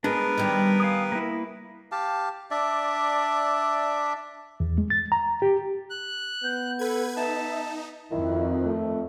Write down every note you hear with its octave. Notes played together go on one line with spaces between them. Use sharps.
G#3 B3 D4 A#4 B4
D#3 G3
F5 G#5 D#6
A#3 E4
G4 F5 A5
D4 D5 E5
E2
G#3
A6
A#5
G4
F#6
B3 G6
A4 B4 G#6
D#4 E5 A5
F2 D#3 E4
A3